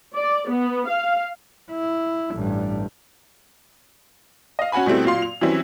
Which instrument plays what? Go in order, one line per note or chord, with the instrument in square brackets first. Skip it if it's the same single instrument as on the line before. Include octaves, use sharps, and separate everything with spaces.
[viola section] D5
B3
F5
[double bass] E4
A1 G2
[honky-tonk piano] D#5 F5
C#4 F#4 F#5 G#5 B5
B2 G3 A3 C4 E4
A#2 F#3 F5 C6
F7
E3 F#3 G3 C4 C#4 E4